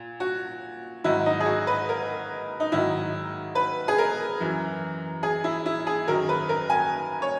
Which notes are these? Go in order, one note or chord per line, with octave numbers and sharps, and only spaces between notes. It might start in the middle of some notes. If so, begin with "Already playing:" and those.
Already playing: A#2
F#4
G#2 D#3 F#3 E4
D#4
G#4
F#4
B4
A#4
D#4
G#2 D#3 F#3 E4
B4
G#4
A#4
F#2 E3
G#4
E4
E4
G#4
F#2 D#3 F#3 A#4
B4
A#4
G#5
C#5